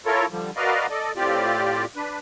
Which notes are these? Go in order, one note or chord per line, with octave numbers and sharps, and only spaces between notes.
E4 F4 A4 A#4 C#5
D3 F3 G3
F#4 A#4 B4 D5 D#5 F5
A4 D5 D#5
A2 C4 F4 G4 D5
D4 B4